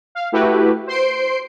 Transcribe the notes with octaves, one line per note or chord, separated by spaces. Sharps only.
F5
A3 E4 F#4 G4 B4
C5 C6 C7 D7